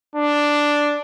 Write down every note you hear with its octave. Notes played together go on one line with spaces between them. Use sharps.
D4